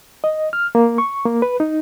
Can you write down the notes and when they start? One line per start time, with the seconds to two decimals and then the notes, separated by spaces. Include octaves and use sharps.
0.24 D#5
0.53 F6
0.75 A#3
0.98 C#6
1.25 A#3
1.42 B4
1.60 D#4